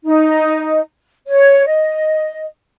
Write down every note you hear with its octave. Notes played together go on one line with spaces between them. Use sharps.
D#4
C#5
D#5